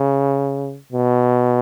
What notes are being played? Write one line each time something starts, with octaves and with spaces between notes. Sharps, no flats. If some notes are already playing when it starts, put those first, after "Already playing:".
Already playing: C#3
B2